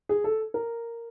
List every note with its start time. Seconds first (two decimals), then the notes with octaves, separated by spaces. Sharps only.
0.09 G#4
0.24 A4
0.54 A#4